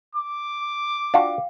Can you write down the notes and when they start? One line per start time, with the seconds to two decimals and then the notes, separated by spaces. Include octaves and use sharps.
0.15 D6
1.14 D4 F4 F#4 F5 G5